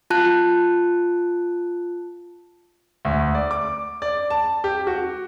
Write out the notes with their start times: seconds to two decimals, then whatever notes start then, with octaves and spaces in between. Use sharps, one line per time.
0.10 F4 A5 F#6
3.05 D2
3.35 D5
3.51 D6
4.02 D5
4.30 A5
4.64 G4
4.87 F#4